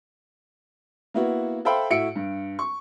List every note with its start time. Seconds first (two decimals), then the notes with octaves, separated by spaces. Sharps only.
1.14 A#3 B3 E4 F#4
1.65 A4 C5 E5 F5 G5 B5
1.90 A2 F#4 E5 C#7 D7
2.16 G2
2.59 C#6